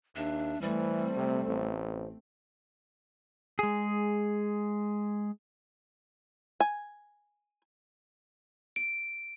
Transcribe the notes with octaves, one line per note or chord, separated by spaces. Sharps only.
D#2 D4 E5
E3 G3 A3 C4 C5
C3
A1
G#3 G#4
G#5
D7